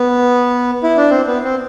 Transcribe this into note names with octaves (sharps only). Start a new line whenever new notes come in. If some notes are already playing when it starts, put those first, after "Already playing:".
Already playing: B3
E4
D4
C4
B3
C4